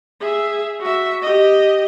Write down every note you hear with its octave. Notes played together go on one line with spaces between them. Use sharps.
G#4 E5
F#4 E5
G4 D#5